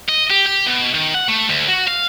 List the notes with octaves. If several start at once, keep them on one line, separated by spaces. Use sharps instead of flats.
D#5
G4
G4
B2
D#3
F#5
A3
D2
F#4
F5